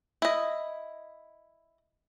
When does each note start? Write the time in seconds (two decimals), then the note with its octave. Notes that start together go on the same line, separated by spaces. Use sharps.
0.22 E4 D#5